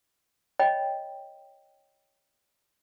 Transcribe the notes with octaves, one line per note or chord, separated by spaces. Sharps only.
C#5 D#5 G5 B5